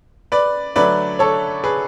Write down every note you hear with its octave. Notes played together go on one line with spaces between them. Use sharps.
B4 D5
D3 F#3 A3 D4 B4 D5
A4 C#5
G#4 B4